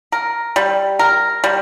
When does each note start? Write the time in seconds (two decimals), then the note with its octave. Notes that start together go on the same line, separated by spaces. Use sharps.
0.12 A#4
0.56 G3
0.99 A#4
1.44 G3